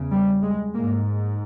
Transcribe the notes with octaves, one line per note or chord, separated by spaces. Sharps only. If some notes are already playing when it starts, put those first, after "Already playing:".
Already playing: E2 C#3
G3
G#3
G#2 A#3